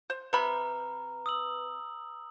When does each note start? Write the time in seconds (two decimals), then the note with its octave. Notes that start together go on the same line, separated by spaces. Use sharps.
0.10 C5
0.33 C3 B4 A#5 B5
1.26 D#6 E6 F#7